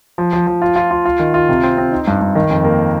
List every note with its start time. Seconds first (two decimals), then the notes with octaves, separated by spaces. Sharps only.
0.18 F3
0.33 F3
0.47 F3
0.62 F4
0.76 F4
0.91 F4
1.05 F4
1.19 D#3
1.34 F4
1.49 C3
1.63 C4
1.78 C4
1.92 D#4
2.07 G2
2.21 G2
2.35 D#3
2.50 F2
2.64 A#3